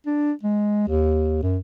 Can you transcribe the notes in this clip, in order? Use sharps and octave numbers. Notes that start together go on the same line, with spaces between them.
D4
G#3
D#2
F#2